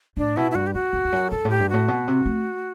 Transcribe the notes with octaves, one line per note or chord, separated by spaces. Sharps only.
A2 D4
B2 E4
E4
G2 F#4
G4
F#2 F#4
E2
E2
F#2
G2 A4
A2
G4
G2
A2 F#4
B2
C3
A3